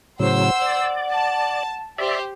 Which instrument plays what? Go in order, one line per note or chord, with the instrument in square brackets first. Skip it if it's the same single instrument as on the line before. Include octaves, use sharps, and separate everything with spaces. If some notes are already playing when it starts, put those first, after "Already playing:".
[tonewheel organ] A2 C#3 F#3 [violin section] C5 E6 [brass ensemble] F#5
[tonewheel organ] D5
[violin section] A5
[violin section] G4 C5 [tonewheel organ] D5 E5